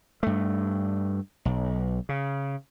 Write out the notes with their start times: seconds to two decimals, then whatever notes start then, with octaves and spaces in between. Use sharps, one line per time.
0.23 G2 A3
1.45 B1
2.09 C#3